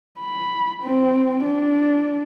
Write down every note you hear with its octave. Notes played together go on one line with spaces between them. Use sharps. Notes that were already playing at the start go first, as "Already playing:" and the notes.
B5
C4
D4